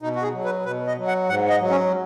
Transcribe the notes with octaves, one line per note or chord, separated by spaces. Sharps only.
B2 D#4
F#4
G#4
F#3
B4
B2 B4
D#5
F#3
F#5
G#2 F#5
D#5
F#3
C#4